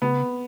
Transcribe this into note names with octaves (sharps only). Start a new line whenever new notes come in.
C#3 B3